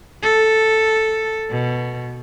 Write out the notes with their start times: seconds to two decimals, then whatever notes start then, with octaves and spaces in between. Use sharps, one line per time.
0.23 A4
1.50 B2